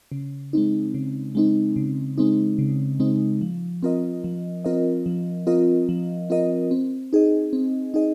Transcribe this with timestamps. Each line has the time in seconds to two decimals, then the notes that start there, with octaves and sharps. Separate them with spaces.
0.12 C#3
0.53 G#3 C4 D#4
0.94 C#3
1.35 G#3 C4 D#4
1.76 C#3
2.18 G#3 C4 D#4
2.59 C#3
3.00 G#3 C4 D#4
3.41 F3
3.83 C4 F4 A#4 D#5
4.24 F3
4.65 C4 F4 A#4 D#5
5.06 F3
5.47 C4 F4 A#4 D#5
5.89 F3
6.30 C4 F4 A#4 D#5
6.71 C4
7.13 D#4 G#4 D#5
7.53 C4
7.94 D#4 G#4 D#5